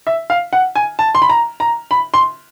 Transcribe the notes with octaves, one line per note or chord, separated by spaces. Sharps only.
E5
F5
F#5
G#5
A5
C6
B5
A#5
A#5
B5
C6